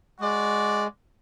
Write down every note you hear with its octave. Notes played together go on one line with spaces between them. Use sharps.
G#3 F#4 D5